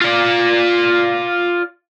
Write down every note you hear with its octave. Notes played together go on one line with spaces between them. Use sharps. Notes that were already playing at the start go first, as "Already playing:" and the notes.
F4 D5